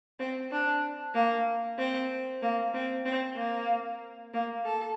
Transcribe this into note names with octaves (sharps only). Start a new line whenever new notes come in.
C4
D4
A#3
C4
A#3
C4
C4
A#3
A#3
A4